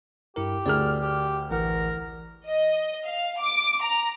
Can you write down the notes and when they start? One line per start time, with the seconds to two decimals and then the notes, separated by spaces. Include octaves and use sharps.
0.36 G2 E4 G4 A#4
0.66 D2 G#4 A#4 D5 F6
1.01 G4
1.51 A1 E3 A#4 F#5
2.47 D#5
3.05 F5
3.40 D6
3.82 A#5